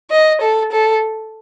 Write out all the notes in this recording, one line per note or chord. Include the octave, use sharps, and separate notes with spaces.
D#5
A4
A4